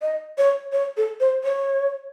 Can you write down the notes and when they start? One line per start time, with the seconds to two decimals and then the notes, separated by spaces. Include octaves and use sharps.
0.02 D#5
0.38 C#5
0.72 C#5
0.97 A4
1.20 C5
1.44 C#5